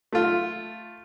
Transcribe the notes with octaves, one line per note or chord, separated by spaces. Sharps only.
A3 F4